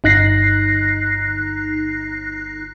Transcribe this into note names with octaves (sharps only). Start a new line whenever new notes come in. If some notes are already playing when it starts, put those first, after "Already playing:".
G1 D#4 F#6 A#6 C7